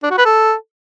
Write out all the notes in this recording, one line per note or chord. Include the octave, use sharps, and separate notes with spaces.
D4
F#4
B4
A4